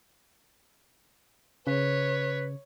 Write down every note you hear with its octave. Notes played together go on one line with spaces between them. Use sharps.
C#3 B4 C#5